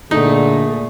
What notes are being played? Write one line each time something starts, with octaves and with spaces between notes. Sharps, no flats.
A#2 D3 A3 D#4 G#4